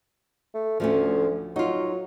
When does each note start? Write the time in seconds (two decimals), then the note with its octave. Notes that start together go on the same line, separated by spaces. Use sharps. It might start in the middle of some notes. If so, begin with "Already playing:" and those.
0.54 A3
0.80 D2 F3 A3 C#4
1.56 F#3 D#4 F4